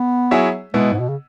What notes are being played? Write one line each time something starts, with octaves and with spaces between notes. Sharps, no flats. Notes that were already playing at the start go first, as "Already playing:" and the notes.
Already playing: B3
F#3 E4 G#4 C#5 E5
B2 G#3 B3 E4
G#2
B2
C#3